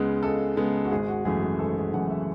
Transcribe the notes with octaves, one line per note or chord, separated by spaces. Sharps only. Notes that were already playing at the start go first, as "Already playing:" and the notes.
Already playing: C#2 C#3 G#3 B3
C#2 A4
C#3 G#3 B3
F#4
G#1 G#4
F#4
F#2 C#3 E3 A3 G#4
G#4
G#1 A4
G#4
F#2 C#3 E3 A3 F#5
E5